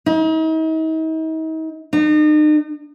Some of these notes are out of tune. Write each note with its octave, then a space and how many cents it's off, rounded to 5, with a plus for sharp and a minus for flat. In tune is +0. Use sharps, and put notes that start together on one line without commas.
D#4 +40
D#4 -40